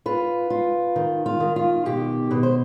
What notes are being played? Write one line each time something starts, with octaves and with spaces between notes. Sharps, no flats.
F4 B4
F4
D#3
F4
D#3
F4
B2 G4
B2 B4
C5